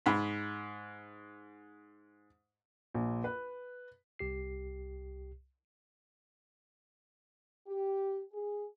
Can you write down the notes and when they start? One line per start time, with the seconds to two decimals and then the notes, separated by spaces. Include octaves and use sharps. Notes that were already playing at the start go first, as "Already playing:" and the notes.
0.06 G#2 B5
2.94 A#1
3.24 B4
4.19 C2 G4 C7
7.67 G4
8.33 G#4